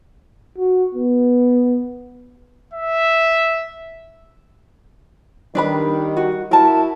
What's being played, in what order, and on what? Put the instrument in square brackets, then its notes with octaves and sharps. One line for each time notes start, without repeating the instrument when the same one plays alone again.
[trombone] F#4
B3
[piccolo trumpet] E5
[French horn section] D#3 G3 [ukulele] D4 B4 B5
[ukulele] F#4
[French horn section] E4 F#4 [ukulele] A#4 A5